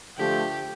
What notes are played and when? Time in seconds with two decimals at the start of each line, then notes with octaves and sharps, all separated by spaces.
0.17 D3 F3 A3 G4